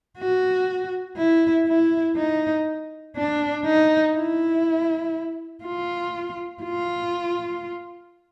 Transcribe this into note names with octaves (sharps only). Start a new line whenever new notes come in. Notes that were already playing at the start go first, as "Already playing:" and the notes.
F#4
E4
E4
D#4
D4
D#4
E4
F4
F4